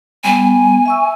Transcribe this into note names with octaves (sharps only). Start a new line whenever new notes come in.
G3 B3 G#5
E5 C#6 E6